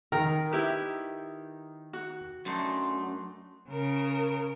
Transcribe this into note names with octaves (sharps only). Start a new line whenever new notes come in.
D#3 A#4
E4 G4 B4
F#4
F#2 A3 D4 D#4 C6
C#3 A#4